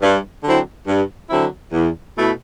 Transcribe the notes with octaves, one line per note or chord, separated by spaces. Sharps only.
G2
D3 F#3 C4 E4
G2
D3 F#3 C4 E4
E2
B2 A3 E4